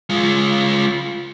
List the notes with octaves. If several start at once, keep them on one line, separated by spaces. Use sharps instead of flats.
G#3 F4